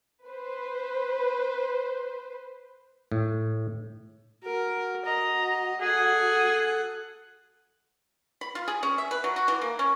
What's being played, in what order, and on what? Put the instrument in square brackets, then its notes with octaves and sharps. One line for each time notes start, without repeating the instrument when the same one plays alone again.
[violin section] B4 C5
[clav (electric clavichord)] A2
[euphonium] F#4 [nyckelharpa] A#4
[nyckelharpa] D#5 [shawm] A#5
[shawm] G#4 [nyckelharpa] A4 F#5
[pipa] B5
F4
G#4
C#4
E5
B4
F#3
F#4
E3
A#3
C#4